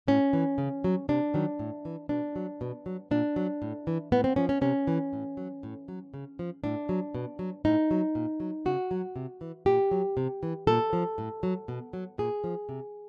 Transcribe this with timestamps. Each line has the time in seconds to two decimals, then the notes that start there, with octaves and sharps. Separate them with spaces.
0.08 A2 C#4
0.33 E3
0.58 C#3
0.84 F#3
1.09 C3 D4
1.34 D#3 F#3
1.59 A2
1.85 E3
2.09 B2 D4
2.36 F#3
2.61 B2
2.86 F#3
3.11 A#2 D4
3.36 F#3
3.62 A2
3.87 E3
4.12 A2 B3
4.24 C4
4.36 F3 C#4
4.49 C#4
4.61 C3 C#4
4.87 E3
5.13 A2
5.37 F#3
5.63 A2
5.88 F#3
6.14 C#3
6.39 F3
6.64 A2 D4
6.89 F#3
7.15 B2
7.39 F#3
7.65 A2 D#4
7.91 F#3
8.15 A#2
8.40 F#3
8.65 C#3 F#4
8.91 F#3
9.16 C3
9.41 E3
9.66 A#2 G4
9.91 F#3
10.17 C3
10.43 E3
10.67 A#2 A4
10.93 F3
11.18 A2
11.43 F#3
11.68 B2
11.93 F#3
12.18 A#2 G#4
12.44 F3
12.69 C3